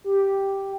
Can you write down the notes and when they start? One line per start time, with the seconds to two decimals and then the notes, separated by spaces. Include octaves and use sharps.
0.04 G4